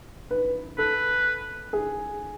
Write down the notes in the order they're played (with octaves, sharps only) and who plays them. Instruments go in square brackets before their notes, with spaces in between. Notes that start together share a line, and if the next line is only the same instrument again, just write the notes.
[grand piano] B4
[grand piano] A4 [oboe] B4
[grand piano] G#4